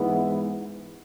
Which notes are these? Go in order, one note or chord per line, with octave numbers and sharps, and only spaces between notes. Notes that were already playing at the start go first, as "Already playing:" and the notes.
Already playing: G#2 E3 G#3 B3 E4